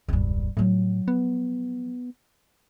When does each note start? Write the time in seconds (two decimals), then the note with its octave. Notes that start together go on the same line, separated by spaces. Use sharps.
0.09 E1 C#2 G2
0.57 A2 F3 F#3
1.08 B3